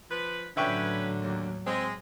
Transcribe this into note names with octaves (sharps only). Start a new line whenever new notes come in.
F3 B4
A2 D3 F#3 C#4 B4 E5 G5 C#6
D#2
G#3 C4